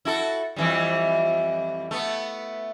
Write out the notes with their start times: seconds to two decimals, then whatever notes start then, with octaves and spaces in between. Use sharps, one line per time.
0.05 E4 F#4 A4
0.56 F2 E3 G3
1.91 A3 B3